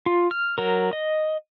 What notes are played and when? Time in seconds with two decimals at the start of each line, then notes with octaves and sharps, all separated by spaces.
0.06 F4
0.31 F6
0.58 F#3 A#4
0.93 D#5